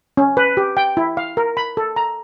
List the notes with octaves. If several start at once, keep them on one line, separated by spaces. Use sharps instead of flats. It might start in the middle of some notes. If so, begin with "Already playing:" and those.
C#4
B4
G4
G5
E4
F5
A#4
B5
A4
A#5